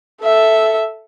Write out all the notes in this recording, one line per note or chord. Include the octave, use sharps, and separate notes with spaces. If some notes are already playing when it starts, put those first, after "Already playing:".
A4 E5